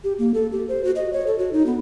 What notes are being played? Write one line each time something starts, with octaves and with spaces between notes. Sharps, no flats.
G4
A#3
A4
G4
C5
F#4
D#5
C#5
A4
F#4
D#4
B3